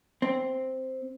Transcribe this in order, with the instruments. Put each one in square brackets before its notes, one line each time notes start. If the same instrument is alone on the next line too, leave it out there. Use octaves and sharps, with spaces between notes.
[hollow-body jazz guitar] C4